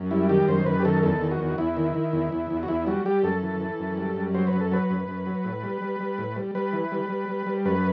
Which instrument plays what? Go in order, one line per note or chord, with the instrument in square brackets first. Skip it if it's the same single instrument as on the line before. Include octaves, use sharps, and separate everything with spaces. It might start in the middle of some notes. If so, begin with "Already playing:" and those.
Already playing: [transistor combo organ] F#2
G3 E4
D#3 G4
F#2 C5
F#2 B4
G4
D#3 A4
E2 A4
D#3
F#4
E2
E2 E4
D#3
D#3
E2
E2
E2
F#4
E2 E4
G3 F#4
G3 G4
F#2 A4
E3
E3
F#2
G3
F#2
F#3 C5
B4
F#2
A4
F#3 B4
F#2
F#2
F#3
A2
G3
G3
G3
A2
G3
G3 B4
E3
G3
G3
G3
G3
F#2 B4